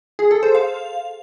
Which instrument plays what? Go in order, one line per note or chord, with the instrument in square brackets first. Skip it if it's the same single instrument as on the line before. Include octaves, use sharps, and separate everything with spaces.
[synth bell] G#4
A4
C5
F5